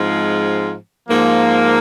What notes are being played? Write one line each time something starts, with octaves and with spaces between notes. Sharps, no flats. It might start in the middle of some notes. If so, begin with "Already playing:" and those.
Already playing: G#2 F3 G#3 C4 F4
G#2 F3 A#3